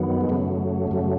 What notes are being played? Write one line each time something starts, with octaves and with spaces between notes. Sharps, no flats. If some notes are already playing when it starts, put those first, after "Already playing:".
Already playing: F#2 D#3 F#3 B3
G#3
F#2 C#3 F#3 A3
F#2 C#3 F#3